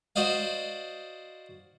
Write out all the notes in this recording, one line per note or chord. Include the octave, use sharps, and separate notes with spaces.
F#4 C5 D5 D#5 F5